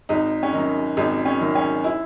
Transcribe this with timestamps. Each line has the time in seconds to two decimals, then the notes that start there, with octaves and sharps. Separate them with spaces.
0.09 G#1 D#4
0.43 C#4
0.53 F#2 D#3 D#4
0.97 G#1 D#4
1.25 C#4
1.40 F#2 D#3
1.55 C#4
1.84 E4